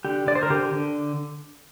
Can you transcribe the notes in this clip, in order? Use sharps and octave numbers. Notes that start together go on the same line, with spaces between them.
D3 G4
D3 D5
C5
A#4
D3 G4
D3